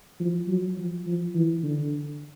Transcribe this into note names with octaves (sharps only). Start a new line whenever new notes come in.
F3
F#3
F3
F3
E3
D3